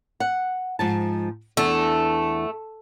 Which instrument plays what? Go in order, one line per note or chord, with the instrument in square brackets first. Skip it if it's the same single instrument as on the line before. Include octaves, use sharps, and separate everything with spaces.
[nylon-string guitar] F#5
G#2 F3 A5
[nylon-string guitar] E2 D4 [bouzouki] A3